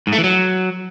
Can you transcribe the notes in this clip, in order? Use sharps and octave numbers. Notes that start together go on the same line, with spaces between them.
G#2
A3
E3
F#3